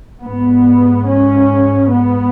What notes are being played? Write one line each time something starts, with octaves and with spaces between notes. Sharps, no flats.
G#2 B3
C#4
B3